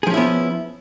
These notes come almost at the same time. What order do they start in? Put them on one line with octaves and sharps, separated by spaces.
G#4 F3 C#4 E4 B3